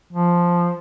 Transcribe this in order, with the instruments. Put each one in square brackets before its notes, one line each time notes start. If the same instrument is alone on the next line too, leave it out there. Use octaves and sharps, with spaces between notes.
[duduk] F3